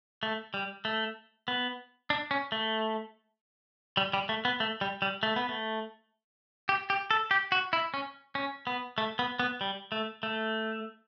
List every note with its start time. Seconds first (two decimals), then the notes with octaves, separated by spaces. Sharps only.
0.23 A3
0.54 G3
0.85 A3
1.48 B3
2.10 D4
2.31 C#4
2.52 A3
3.97 G3
4.13 G3
4.29 A3
4.45 B3
4.60 A3
4.81 G3
5.02 G3
5.23 A3
5.36 B3
5.49 A3
6.69 G4
6.90 G4
7.11 A4
7.31 G4
7.52 F#4
7.73 E4
7.94 C#4
8.35 C#4
8.67 B3
8.98 A3
9.19 B3
9.39 B3
9.61 G3
9.92 A3
10.23 A3